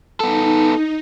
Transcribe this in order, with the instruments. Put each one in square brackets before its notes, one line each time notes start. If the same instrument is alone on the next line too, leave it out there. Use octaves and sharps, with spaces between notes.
[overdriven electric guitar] B3 A4 [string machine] D#4